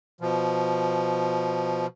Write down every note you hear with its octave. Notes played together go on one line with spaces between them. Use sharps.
B2 F3